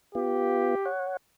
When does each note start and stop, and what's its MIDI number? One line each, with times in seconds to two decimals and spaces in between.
0.15 0.75 59
0.15 0.75 65
0.15 0.89 67
0.85 1.17 73
0.85 1.17 78